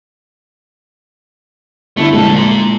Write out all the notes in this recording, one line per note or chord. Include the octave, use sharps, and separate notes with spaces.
G1 D3 A3 E4
F2 A#2 G#3 A4
A#5 C6